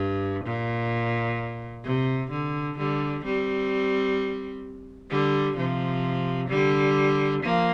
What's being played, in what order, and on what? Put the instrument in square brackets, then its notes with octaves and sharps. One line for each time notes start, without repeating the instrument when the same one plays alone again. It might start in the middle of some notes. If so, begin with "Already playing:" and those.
Already playing: [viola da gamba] G2
A#2
C3
D3
D3 G3
G3 C4
D3 G3
C3 F3
D3 G3
F3 A#3